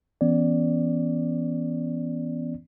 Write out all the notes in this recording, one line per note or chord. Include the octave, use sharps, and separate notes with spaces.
E3 B3 C#4 D5